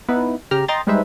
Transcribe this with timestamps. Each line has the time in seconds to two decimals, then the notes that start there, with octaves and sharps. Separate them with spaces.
0.09 B3 D#4 E4 B4
0.51 C#3 G4 A#5 F6
0.68 D#5 G5 A#5 C6 A6
0.87 G3 G#3 D#4 B4 C5 E5